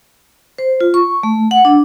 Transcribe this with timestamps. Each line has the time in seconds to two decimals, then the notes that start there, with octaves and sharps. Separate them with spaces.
0.58 C5
0.81 F4
0.94 C#6
1.23 A3
1.51 F#5
1.65 D4